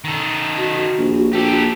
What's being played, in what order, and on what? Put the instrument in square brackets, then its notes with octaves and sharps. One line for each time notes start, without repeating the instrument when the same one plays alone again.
[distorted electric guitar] D#3 A4
[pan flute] F#4
[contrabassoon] A#1
[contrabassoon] A#1 [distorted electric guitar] G4 A4